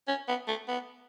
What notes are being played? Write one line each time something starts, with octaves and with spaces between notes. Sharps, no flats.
C#4
B3
A3
B3